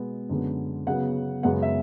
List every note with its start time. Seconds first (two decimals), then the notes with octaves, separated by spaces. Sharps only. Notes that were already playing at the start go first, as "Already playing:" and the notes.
Already playing: B2 G#3 B3
0.29 F#2 D3 G#3 B3
0.87 C#3 F#3 B3 F#5
1.43 F#2 C#3 G#3 B3 F#5
1.62 E5